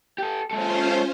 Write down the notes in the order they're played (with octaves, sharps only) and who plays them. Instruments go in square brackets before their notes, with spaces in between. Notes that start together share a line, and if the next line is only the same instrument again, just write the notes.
[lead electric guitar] G4 A4
[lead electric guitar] G#3 A4 [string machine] C#4 F4 C5